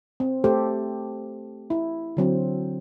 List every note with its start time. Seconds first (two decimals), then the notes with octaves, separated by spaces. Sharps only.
0.20 C4
0.44 A3 G4 A4 C5
1.70 E4
2.17 D3 F#3 C4